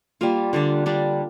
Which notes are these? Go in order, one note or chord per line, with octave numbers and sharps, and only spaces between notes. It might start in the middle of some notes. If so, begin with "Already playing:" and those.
G3 A#3 F4
D3 G3 D4
D3 G3 D4